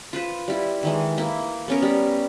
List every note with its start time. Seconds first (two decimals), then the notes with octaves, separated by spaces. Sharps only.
0.13 F4 B4 C5
0.48 G3 E4
0.83 D#3 E3 G#3
1.18 A#3 E4
1.68 B3 C#4 A#4
1.82 G3